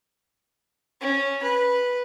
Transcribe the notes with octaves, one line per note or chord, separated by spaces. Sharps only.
C#4
B4